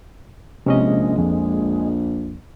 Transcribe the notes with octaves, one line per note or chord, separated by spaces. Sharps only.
A#1 C3 G#3 C#4 D#5
F2